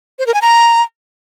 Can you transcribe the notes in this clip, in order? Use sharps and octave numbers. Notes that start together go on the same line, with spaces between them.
C5
A#4
G#5
A#5